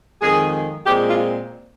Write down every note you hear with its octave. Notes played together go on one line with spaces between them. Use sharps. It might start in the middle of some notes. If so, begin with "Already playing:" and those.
F2 D#3 G#3 G#4
A#2 G#3 C4 G4
F4